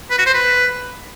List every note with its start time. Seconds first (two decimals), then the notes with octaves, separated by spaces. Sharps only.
0.10 B4
0.18 F#4
0.26 C5
0.34 B4